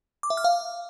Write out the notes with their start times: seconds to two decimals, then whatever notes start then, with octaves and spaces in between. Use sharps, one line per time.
0.23 D6
0.30 E5
0.37 F6
0.44 F5